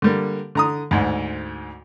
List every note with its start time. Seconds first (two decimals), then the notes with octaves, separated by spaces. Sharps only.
0.02 D3 G3 A#3
0.55 D3 A#5 D#6
0.91 D2 G#2